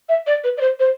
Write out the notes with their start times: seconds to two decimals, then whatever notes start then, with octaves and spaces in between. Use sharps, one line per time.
0.09 E5
0.27 D5
0.44 B4
0.57 D5
0.61 C5
0.80 C5